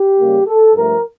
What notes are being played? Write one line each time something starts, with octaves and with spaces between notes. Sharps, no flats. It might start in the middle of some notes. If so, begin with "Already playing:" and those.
Already playing: G4
C#3 G3 A#3
A4
G2 F3 A3 A#4